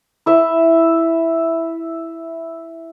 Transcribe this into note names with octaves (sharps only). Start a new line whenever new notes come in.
E4 E5